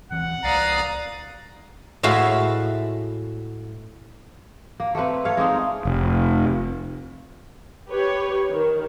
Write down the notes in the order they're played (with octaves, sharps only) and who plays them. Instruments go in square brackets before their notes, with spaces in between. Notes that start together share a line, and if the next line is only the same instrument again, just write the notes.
[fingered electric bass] D#1 E3 C4 [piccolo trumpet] F#5
[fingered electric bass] C2 [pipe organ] D5 F5 [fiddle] A#5 D#6
[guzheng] A2 G#3 F#4 E5 F5 B5
[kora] A#3
A3 A#3 C4 B4
A3 C#5 F5
G#3 A#3 C4 D#4
[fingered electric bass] F1
[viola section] G4 B4 C#5
D#3